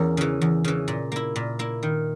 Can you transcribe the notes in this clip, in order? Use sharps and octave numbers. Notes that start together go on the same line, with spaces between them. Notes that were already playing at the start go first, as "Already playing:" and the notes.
Already playing: E2 A#3 C#4
C#3 E3
E2
C#3 E3
A#2
A#3 E4
A#2
A#3 E4
D#3